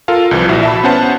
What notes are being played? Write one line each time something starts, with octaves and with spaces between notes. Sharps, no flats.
F4 A4 A#4 F5
C2 E3 F3
A#1 E4 F#4
E5 A5 B5
B3 C#4 C5 F#5 A5